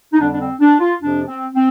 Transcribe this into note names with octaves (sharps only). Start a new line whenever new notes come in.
D#4
F2 D3 G3 D4
D4
C4
D4
F4
F2 C3 F3 D4
C4
C4